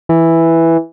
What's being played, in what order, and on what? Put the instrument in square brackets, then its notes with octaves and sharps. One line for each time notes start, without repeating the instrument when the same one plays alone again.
[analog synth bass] E3